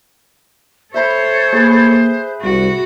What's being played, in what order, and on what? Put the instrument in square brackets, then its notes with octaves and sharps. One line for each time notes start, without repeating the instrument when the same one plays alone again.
[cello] A4 C#5 [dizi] C5 [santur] E5 A5 B5
[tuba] A#3 [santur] G#4 B4
[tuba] C2 [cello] F#4